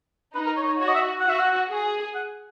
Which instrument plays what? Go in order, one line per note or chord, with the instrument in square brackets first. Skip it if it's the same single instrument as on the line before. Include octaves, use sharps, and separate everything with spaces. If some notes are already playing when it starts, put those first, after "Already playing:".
[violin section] D#4 [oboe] B4
[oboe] A#4
C#5
C#5
[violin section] F#4 [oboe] C#5
[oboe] D#5
E5
F#5
[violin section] F#4 [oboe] E5
[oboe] F#5
[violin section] G#4
[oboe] F#5